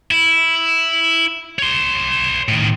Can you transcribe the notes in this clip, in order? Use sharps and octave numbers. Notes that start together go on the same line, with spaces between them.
E4
C#5 C6
A2 D#3